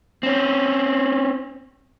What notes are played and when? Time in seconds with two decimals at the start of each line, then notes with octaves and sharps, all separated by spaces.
0.23 C4 C#4